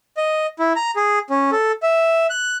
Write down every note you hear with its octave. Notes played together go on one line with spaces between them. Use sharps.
D#5
E4
A#5
G#4
C#4
A4
E5
F#6